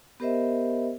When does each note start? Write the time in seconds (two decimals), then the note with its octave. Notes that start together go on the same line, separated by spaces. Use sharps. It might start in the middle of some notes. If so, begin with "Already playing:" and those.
0.20 B3 G4 A#4 C5 D#5 E5